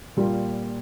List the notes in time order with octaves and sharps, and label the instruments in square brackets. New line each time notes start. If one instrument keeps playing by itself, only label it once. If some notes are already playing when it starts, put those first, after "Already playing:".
[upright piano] A#2 G3 A#3 F4